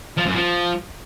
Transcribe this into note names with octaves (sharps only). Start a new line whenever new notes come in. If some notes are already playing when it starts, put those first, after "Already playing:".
F3
F#2
F3